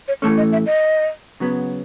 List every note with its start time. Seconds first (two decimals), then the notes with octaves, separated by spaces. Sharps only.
0.08 C#5
0.22 A2 E3 A3 C#4 A4
0.37 D#5
0.52 E5
0.66 D#5
1.40 C#3 F#3 B3